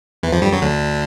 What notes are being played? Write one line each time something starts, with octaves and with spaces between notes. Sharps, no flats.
E2 E3
F2 F3
G2 G3
F#2 F#3
D2 D3